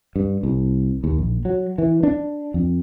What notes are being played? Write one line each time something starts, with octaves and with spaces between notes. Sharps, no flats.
G2
C2
D#2
A#1
F#3
E3
D4
F2